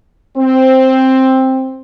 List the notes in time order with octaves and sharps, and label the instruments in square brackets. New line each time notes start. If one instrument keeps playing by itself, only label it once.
[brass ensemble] C4